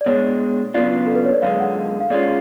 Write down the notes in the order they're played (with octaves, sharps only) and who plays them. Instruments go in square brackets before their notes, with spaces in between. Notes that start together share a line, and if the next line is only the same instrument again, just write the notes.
[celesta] D5
[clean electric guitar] B2 G#3 D4 [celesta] C#5
[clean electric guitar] C#3 F#3 B3 D4 F4 [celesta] D5
[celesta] A4
B4
C#5
D5
[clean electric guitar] F#2 D3 G#3 [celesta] F5
[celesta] F#5
F5
[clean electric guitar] G#2 G#3 C#4 F4 [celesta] D5